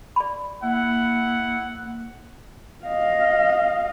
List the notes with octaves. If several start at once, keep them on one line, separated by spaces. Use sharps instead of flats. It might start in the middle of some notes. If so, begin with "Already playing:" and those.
D5 B5
A#3 E4 F#5
D#5 F5